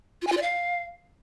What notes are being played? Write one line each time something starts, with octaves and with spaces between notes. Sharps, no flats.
F4
G#5
F4
D5
F5